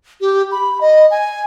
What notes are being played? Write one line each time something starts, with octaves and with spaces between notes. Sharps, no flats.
G4
B5
D#5
G#5